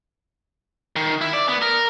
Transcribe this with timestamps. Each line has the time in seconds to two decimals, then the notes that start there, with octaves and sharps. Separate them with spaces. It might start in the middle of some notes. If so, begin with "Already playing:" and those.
0.96 D#3
1.21 E4
1.33 D5
1.48 B3
1.62 A#4